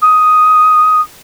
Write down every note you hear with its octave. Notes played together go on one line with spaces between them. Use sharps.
D#6